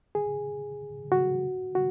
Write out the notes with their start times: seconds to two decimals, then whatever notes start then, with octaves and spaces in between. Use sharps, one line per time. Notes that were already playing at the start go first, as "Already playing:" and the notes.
0.15 G#4
1.12 F#4
1.75 F#4